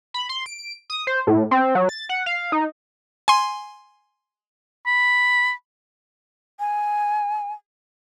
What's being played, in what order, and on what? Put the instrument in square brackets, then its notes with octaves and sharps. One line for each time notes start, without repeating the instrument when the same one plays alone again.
[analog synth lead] B5
C6
D7
D#6
C5
A2
C4
F#3
A6
F#5
F5
D#4
[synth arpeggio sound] G#5 C6
[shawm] B5
[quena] G#5